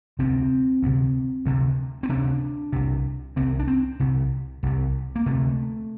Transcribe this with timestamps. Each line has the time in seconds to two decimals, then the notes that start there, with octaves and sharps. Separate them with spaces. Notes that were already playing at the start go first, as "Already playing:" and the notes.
0.19 D2 C3 C4
0.83 D2 C3
1.46 D2 C3
2.03 C4
2.09 D2 C3 D4
2.72 C2 C3
3.36 C2 C3 C4
3.59 D4
3.67 C4
4.00 C2 C3
4.63 C2 C3
5.16 A#3
5.26 D2 C3 A3